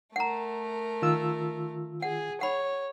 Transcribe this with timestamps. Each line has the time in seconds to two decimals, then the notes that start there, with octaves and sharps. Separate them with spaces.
0.16 A3 A#4 F#5 A#5
1.02 D#3 F4 E6
2.02 G#4 F#5
2.41 C#5 F#5 B5